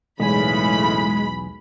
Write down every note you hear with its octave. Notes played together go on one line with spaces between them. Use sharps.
B1 E2 A2 C#3 E3 G#3 G#5 B5